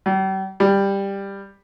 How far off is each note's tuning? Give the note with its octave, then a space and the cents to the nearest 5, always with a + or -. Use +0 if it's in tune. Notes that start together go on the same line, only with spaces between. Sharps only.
G3 -40
G3 +10